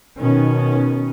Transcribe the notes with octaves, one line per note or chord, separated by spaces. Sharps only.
B2 D#3 B3 C#4